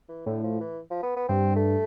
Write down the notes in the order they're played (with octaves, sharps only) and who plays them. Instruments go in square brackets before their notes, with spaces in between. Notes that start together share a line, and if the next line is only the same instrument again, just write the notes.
[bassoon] E3
[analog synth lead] A2 [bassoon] D3
[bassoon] F3
E3
F3
B3
B3
[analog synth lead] G2 [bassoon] C4
[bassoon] A3